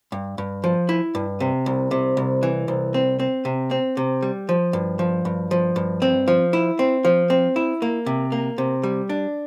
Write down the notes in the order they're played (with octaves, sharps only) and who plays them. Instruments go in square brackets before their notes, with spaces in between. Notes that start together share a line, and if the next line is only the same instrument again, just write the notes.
[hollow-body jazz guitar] G2
G2
F3
E4
G2
C3
C2
C3
C2
E3
C2
C4
C4
C3
C4
C3
G3
F3
G2
F3
G2
F3
G2
C4
F3
E4
C4
F3
C4
E4
A#3
C3
A#3
C3
G3
D4